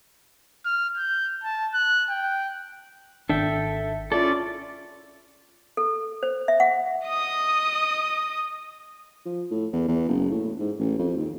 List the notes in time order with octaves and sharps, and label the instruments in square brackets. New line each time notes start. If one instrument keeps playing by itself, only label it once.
[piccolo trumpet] F6
G6
A5
F#6
G5
[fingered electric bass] G#1 D#3 D4 [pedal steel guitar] A4 E5 G5
[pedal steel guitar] C#4 E4 A4 [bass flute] F4 [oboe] D5
[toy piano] A4
C5
E5
F#5
[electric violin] D#5 D#6
[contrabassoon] F3
A2
E2
E2
F#1
A2
G#2
A1
F2
D#2